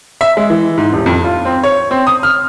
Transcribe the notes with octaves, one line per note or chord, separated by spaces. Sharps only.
E5
G#3
E3
G#2
D#1
F2
F4
C4
C#5
C4
D#6
F6